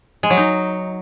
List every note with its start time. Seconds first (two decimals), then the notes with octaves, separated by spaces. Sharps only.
0.23 G#3
0.30 F#3
0.37 D#4